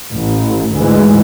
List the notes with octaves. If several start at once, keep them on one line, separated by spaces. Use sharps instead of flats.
A1
D2 G#2 E3 G#3